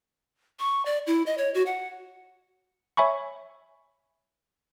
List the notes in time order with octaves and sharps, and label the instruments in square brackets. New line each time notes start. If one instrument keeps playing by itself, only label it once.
[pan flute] C#6
D5
E4
D#5
C#5
F#4
F#5
[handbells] C#5 E5 G#5 B5 C#6